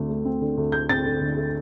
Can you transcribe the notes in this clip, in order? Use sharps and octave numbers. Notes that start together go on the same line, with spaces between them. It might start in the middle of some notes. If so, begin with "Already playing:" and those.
Already playing: D2 D3 C4
A3
C4
D3
D2
A3 G6
C4 A6
D3
D2
A3